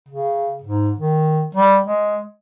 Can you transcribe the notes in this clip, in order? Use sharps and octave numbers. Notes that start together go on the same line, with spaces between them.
C#3
G#2
D#3
G3
G#3